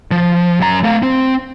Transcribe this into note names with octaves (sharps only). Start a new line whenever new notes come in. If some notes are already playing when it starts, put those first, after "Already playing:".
F3
F#2 A#5
A3 F5
C4 C5